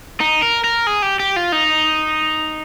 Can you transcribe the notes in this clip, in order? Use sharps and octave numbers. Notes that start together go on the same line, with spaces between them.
D#4
A#4
A#4
G#4
G4
G4
F4
D#4